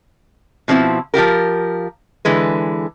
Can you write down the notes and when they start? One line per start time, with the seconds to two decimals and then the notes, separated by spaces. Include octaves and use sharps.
0.68 B2 F3 C4 E4
1.14 F3 F4 G4 A#4
2.25 D3 E3 G#3 B4